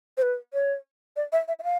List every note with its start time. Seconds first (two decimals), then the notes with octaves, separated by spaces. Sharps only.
0.17 C5
0.22 B4
0.54 C#5
1.16 D5
1.32 E5
1.48 E5
1.59 E5
1.64 F5